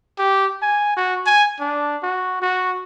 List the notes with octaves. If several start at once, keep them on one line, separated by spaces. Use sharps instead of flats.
G4
G#5
F#4
G#5
D4
F#4
F#4